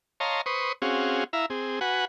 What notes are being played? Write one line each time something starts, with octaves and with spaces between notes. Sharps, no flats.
C#5 D#5 F5 A5 A#5 C6
B4 C5 C#6 D#6
C4 C#4 F#4 G#4 F5
E4 E5 F5 A#5
C4 G#4
F#4 B4 F#5 G#5